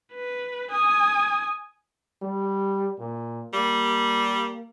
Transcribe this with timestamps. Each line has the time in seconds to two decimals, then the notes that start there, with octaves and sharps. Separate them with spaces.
0.12 B4
0.71 G#5 D#6
2.22 G3
2.99 A#2
3.54 G3 A#3